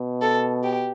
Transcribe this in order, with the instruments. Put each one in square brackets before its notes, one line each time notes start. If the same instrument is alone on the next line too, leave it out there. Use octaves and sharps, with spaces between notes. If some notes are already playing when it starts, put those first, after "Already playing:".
Already playing: [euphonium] B2
[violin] A4
G4